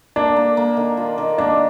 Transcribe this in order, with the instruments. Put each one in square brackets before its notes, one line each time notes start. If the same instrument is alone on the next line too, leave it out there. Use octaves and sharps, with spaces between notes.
[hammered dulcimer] A#3 [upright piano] D4
[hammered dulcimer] A#3
A#3
D#3
F4
D#3
[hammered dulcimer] A#3 [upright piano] D4